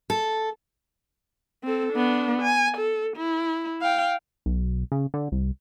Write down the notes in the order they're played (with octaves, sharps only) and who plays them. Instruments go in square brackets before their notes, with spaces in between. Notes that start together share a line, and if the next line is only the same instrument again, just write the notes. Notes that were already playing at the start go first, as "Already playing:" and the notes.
[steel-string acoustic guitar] A4
[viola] C4 A4
B3 D4
G#5
A4
E4
F5 G5
[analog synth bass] B1
C#3
D3
C2